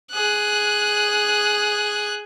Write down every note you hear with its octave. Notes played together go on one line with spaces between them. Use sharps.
G#4 F#6